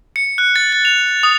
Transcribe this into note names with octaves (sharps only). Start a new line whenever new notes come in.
C#7
F#6
A6
A6
F7
D#6